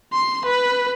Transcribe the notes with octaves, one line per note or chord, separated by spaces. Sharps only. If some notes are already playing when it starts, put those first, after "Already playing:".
C6
B4